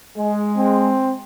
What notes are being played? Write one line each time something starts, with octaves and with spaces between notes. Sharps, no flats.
G#3
C4